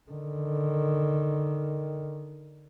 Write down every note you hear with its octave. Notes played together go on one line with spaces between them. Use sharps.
D3 D#3